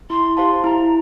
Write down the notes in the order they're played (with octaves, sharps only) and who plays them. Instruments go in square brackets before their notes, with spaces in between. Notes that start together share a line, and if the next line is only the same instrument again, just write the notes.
[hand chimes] E4 [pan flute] C6
[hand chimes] G4 C5 F5 A5 [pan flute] C6
[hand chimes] E4 [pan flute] A#5